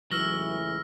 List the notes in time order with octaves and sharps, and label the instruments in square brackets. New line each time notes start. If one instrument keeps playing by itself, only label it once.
[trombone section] C#2 A2 E3 [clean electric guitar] F#3 [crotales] E6 F6 A#6